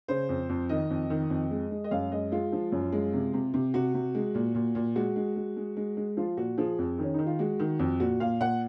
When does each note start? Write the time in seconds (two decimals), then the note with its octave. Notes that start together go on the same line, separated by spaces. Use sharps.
0.08 C#3 C5
0.29 F2
0.49 F2
0.69 D#3 D#5
0.90 F2
1.10 D#3
1.30 F2
1.51 G#3
1.71 G#3
1.84 D#5
1.91 F#2 F5
2.12 G#3 D#5
2.32 G#3 F4
2.52 F3
2.72 F#2
2.92 G#3
3.13 C3
3.33 C3
3.54 C3
3.74 C3 F#4
3.94 C3
4.15 G#3
4.35 A#2
4.55 A#2
4.75 A#2
4.96 G#3 F#4
5.16 G#3
5.36 G#3
5.56 G#3
5.77 G#3
5.97 G#3
6.17 F3 F4
6.37 A#2 F#4
6.58 F3 G#4
6.79 F2
6.99 D#3 C#4
7.14 D#3 D#4
7.26 F4
7.39 G#3 F#4
7.59 D#3
7.79 F2
8.00 A#2 F#4
8.20 A#2 F5
8.40 A#2 F#5